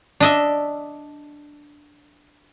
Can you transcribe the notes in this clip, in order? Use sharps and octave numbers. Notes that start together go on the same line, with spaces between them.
D4 D#5 E5